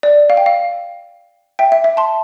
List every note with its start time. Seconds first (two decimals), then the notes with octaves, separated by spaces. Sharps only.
0.03 D5
0.30 F5
0.37 G5
0.46 F5
1.59 E5 G5
1.72 E5
1.84 E5
1.97 A5 C6